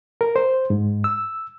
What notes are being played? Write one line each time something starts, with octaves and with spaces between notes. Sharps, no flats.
A#4
C5
G#2
E6